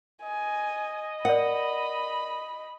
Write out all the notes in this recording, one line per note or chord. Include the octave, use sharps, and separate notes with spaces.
D#5 G#5
A#4 D5 F#5 B5